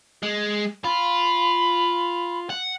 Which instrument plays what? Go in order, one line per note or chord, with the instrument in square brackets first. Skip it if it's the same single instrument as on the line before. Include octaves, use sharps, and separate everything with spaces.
[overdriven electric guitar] G#3
[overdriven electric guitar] F4 [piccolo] B5
[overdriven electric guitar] F#5